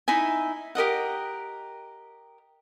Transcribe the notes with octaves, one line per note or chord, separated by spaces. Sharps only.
D#4 E4 E5 G#5
G4 A#4 D#5 F#5